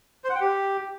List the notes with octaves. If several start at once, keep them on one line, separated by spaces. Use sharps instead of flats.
C5
F#5
G5
G4